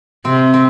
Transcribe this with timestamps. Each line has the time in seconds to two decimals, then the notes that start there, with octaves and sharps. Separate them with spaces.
0.25 C3 C4
0.54 C4